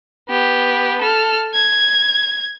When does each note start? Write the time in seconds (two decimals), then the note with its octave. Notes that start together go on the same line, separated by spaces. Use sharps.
0.29 B3 G4
1.02 A4 F6
1.54 G#6